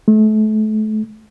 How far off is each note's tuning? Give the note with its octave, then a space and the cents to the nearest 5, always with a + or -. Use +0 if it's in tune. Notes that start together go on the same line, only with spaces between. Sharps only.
A3 -35